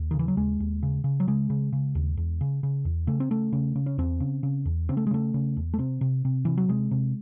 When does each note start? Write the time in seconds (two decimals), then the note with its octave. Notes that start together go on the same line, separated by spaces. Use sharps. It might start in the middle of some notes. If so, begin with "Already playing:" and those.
Already playing: D#2
0.11 D#3
0.14 C#3
0.19 E3
0.28 F#3
0.37 D#2 G#3
0.60 D#2
0.83 C#3
1.04 C#3
1.20 F#3
1.28 C#3 G#3
1.50 C#3
1.73 C#3
1.95 D#2
2.17 E2
2.41 C#3
2.63 C#3
2.85 E2
3.07 C#3 A3
3.20 C4
3.30 C#3 A3
3.53 C#3
3.75 C#3
3.86 C#4
3.98 E2 C4
4.20 C#3
4.43 C#3
4.65 E2
4.89 C#3 C4
4.97 A3
5.07 G#3
5.11 C#3 A3
5.34 C#3
5.57 E2
5.74 A3
5.79 C3 C4
6.01 C3
6.25 C3
6.45 C3 E3
6.57 F#3
6.69 C3 G#3
6.91 C3